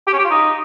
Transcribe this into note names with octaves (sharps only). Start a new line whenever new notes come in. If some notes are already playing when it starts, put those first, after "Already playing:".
G4
C#4
G4
F4
D#4